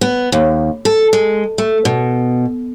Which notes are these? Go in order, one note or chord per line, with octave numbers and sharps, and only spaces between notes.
B3
D#2
A4
G#3
A3
B2